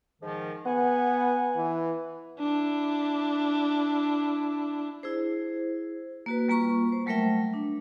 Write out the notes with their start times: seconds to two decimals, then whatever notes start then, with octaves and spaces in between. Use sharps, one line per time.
0.22 G#2 D#3 F3
0.66 B3 F#5 G#5
1.56 E3
2.39 D4 E4
5.03 E4 G#4 C5
6.26 A#3 F#4 B4
6.48 G3 A#3 F4 A#5 C#6
6.92 C5
7.06 F#3 G3 A3 A#4 E5 G5
7.54 D4